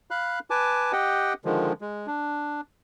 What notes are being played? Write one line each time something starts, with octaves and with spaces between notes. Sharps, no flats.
F5 B5 F#6
B4 G#5 A5 D6
G4 D#5 F#5 G5
D3 D#3 F3 G#3
G#3
D4